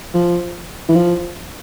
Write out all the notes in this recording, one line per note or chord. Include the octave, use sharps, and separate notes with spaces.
F3
E3
F3